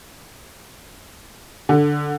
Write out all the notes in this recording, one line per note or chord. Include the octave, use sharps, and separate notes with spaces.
D3